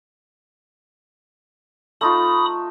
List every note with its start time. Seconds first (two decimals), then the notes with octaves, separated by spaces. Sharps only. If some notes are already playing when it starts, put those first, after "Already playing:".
2.01 A3 D#4 F4 B5 D#6